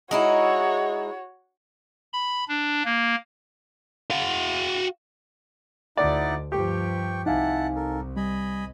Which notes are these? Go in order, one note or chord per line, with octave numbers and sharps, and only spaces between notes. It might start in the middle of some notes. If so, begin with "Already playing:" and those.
G#3 D#4 E4 F#4 C#5
B5
D4
A#3
F#4 F5
D2 D3 D#4 E4 D5 F#5
G2 F3 G4 G5 C#6
C2 D#4 E4 F5 F#5 G#5 A5
A4 A#4
G3 D#5 G#5 B5